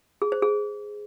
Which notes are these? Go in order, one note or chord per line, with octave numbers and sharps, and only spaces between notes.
G#4
C5
G#4